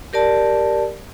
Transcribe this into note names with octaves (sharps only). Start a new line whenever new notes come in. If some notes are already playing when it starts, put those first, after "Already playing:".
G4 A#4 D5 A5